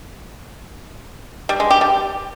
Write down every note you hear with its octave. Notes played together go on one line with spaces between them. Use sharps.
G3
G#3
G4
G3